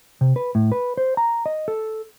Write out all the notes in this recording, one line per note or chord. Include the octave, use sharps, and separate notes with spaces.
C3
B4
A2
B4
C5
A#5
D#5
A4